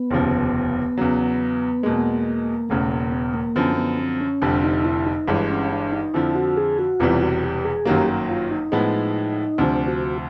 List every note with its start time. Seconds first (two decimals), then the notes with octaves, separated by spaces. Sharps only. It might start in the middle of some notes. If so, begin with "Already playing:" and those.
Already playing: B3
0.11 F1 D#2 C#3 F3
0.97 E2 C#3 F#3
1.83 E2 B2 G#3 A#3
2.69 E1 E2 C#3 A3
2.91 A#3
3.12 B3
3.34 A#3
3.55 F#2 D3 F3 B3
3.77 B3
3.99 C4
4.21 C#4
4.42 F1 F2 D3 G3 D4
4.64 D#4
4.85 E4
5.06 D#4
5.27 G1 G2 E3 G#3
5.49 C#4
5.71 D4
5.92 D#4
6.14 F2 D3 F3 E4
6.35 F#4
6.57 G#4
6.78 F#4
7.00 E1 E2 C3 E3 G3 F4
7.21 F#4
7.43 G4
7.64 G#4
7.85 G1 F#2 D#3 F#3 A#3 G4
8.29 F4
8.51 D#4
8.72 A2 F3 G#3 B3
9.58 D2 C3 F3 D4
9.87 F#4